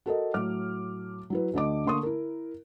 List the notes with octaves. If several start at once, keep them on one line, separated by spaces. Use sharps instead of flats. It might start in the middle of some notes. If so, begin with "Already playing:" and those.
F#4 A4 A#4 D#5
A2 F#3 D6 F6
F#3 E4 B4
D2 D3 D#5 D6
D3 A#3 C6 C#6 D#6
E4 A#4